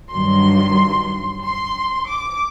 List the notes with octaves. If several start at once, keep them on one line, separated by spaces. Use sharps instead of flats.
G2 D#3 F#3 C6
C6
D6